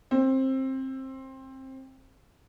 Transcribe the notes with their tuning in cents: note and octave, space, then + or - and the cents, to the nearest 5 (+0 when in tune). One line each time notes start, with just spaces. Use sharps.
C4 +20